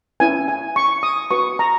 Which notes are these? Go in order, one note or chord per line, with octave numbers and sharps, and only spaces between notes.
C#4 E4 B4 G#5
G#5
C#6
D#6
F#4 B4 C#6
A#5